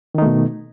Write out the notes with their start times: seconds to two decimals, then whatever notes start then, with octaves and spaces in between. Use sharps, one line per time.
0.15 D#3
0.18 D#4
0.22 A3
0.26 B2